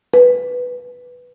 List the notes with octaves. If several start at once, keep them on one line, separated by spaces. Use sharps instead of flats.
B4